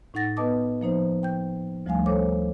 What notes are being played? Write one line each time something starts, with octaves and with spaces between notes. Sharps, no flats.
A2 D#4 F#5 A6 A#6
B3 B4 D#5 A5 D6 D#6
F3 A#3 D#4 C5
G5 G6
D2 F3 G3 A3 F5 G#5
A4 C5 C#5 D6